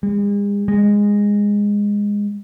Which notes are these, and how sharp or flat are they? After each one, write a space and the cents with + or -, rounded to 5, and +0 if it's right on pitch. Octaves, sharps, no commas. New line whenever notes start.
G#3 -45
G#3 -15